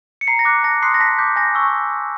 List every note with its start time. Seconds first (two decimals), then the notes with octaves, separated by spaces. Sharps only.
0.21 C#7
0.27 A#5 C7
0.39 A#6
0.45 D6 F#6
0.63 A5 A#6
0.82 C6 D#6 F#6 C7
0.94 A#6
1.00 A5 B6
1.19 D6 G6
1.36 G#5 A#6
1.55 C#6 E6